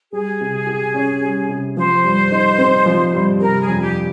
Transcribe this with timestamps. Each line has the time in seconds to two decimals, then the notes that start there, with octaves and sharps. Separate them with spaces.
0.13 G3 G#4
0.41 C3
0.67 G4
0.94 C#4
1.21 G3
1.49 C3
1.77 F3 C5
2.04 G2
2.32 D#4
2.58 C4
2.86 F3
3.14 G2
3.40 C3 A#4
3.61 G#4
3.68 F2
3.82 G4